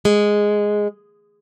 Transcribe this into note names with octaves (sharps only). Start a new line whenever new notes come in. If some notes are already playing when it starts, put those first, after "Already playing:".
G#3